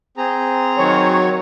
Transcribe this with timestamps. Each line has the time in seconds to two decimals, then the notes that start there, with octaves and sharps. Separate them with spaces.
0.18 C4 G#4 A#5
0.77 D#3 F#3 C#5